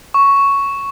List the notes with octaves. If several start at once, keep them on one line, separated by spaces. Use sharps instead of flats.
C#6